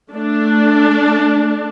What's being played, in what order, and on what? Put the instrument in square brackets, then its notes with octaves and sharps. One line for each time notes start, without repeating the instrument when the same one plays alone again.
[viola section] A3 D4